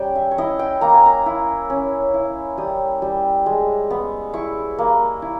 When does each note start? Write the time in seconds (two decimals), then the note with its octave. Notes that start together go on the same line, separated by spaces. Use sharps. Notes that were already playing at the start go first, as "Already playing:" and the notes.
Already playing: G3 C#4 G5 A#5
0.15 E5
0.31 C#5
0.38 E4 D#5
0.59 G5
0.81 A#3 A#5
0.94 G#5
1.06 A#5
1.26 E4
1.70 C#4
2.14 E4
2.57 G3 D#6
3.02 G3
3.46 G#3
3.90 B3
4.33 E4 C#6
4.78 A#3
5.22 E4